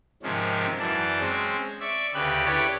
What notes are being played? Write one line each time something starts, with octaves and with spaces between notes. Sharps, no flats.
G#2 C3 D#3 F3 C#4
F#2 E3 D5 A5
G#3 C4 C#4
D5 E5 C#6
D2 C#3 G4 B4 F#6
E4 G4 A4 B4 C#5 D5